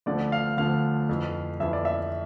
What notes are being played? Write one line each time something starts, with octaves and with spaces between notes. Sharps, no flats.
D2 D3 F3 D5
F5
D2 D3 F3 F5
F2 E3
F2 E3 E5
D5
E5